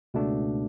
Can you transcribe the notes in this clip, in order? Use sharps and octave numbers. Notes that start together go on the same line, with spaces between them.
C#2 B2 A3 D4